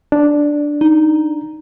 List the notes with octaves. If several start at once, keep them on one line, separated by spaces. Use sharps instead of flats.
D4
D#4